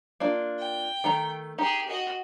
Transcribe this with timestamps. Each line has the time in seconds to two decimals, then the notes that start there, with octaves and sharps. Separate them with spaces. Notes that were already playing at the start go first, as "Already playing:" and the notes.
0.20 A#3 D4 F4
0.59 G5
1.04 D#3 A3 A#5
1.58 D#4 G4 G#4
1.88 F#4 D#5